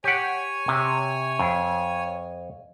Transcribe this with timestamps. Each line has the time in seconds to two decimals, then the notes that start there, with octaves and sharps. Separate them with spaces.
0.04 G4 C#5 F#5 G#5
0.68 C3
1.39 F2